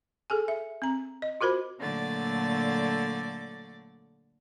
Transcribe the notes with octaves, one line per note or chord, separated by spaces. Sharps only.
G#4 A4 G#5
E5
C4 A#5
D#5
F4 F#4 A#4 C5 B5
A#2 D3 F#3 A3 D5 A6